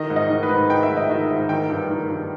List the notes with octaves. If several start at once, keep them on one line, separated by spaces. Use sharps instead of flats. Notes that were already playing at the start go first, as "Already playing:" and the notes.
Already playing: D#3 D#5
G#2
D#5
D#3
B4
G#2
D#3 G5
E5
G#2
D#5
D#3 E5
G#2
D#3 G5
G2
D#3
G2